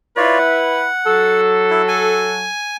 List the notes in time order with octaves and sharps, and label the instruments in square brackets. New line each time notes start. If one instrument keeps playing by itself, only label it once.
[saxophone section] E4 B4 [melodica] F4 C#5 D5
[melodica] F#5
[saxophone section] F#3 F#4 A4
[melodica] E4
G#5